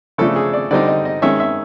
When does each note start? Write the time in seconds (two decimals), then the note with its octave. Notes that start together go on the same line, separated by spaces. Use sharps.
0.18 C#3 F3 A3 D4 A4
0.36 G#4
0.53 D5
0.71 D3 G3 C4 D#4 D5
0.88 D#5
1.05 D#5
1.22 D#3 G#3 C#4 E5
1.40 E5